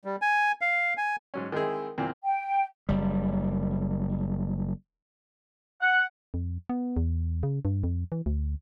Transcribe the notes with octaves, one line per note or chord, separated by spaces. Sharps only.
G3
G#5
F5
G#5
G#2 F#3 C#4
D#3 G#3 C4 E4 G#4
E2 A#2 A#3 C4
G5
F#1 G3
F#5
F2
B3
E2
C#3
G2
F2
E3
D2